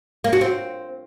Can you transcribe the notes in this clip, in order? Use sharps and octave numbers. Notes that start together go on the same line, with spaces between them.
A#3
F#4
C4